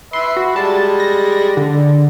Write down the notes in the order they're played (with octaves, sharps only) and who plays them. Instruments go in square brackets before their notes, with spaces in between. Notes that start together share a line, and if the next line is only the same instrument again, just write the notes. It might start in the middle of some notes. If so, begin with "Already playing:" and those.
[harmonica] B4 E5 [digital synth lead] C6
[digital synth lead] F#4
[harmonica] G3 G#3 [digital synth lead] A5
[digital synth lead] A#6
D3